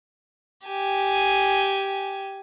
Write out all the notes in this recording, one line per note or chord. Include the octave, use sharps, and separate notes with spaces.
G4 G#5